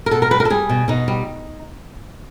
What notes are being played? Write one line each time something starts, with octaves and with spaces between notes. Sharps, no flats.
A#4
B2 A4
A#4
G3 B4
A#4
A4
G3 G#4
B2
B2 D#4
G3